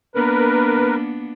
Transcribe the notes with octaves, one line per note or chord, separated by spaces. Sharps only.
A#3 B3 D4 A#4 B4